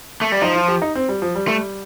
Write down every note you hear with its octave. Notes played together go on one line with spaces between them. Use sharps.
A3
G3
F3 D#4
F4
G4
D#4
C4
G3
F3
G3
A3